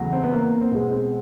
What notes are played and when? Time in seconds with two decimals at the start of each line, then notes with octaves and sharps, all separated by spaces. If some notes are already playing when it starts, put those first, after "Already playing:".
Already playing: E2 C#3 F#3 A3
0.13 C4
0.23 B3
0.33 A#3
0.61 C4
0.72 B2 G#3 B3
0.92 C4